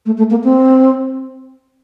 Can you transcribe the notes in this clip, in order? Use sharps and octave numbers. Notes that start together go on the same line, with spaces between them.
A3
A3
A#3
C4